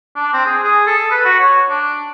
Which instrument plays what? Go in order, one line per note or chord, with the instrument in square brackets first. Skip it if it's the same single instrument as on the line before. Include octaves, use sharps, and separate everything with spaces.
[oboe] D4
C4
G#4
G#4
A4
B4
F#4
C#5
D4